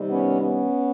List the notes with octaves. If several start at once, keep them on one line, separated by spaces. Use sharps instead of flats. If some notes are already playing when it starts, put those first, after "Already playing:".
Already playing: C3 D#3 G3
B3 C#4
B3 C#4